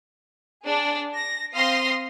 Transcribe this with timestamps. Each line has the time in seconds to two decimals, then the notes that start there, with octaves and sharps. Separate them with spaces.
0.64 D4 G#4
1.16 A#6
1.54 C4 F5 C6 D#6 A#6 C7